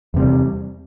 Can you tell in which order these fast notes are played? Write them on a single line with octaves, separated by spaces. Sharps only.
E2 C3 G3